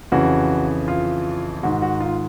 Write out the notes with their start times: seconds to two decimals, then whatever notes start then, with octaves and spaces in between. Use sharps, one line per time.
0.12 F2 C#3 E3 F#4
0.88 F4
1.63 G#2 D#3 F#4
1.82 F#4
2.00 F4